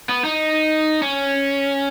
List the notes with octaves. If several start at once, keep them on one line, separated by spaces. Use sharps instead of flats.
B3
D#4
C#4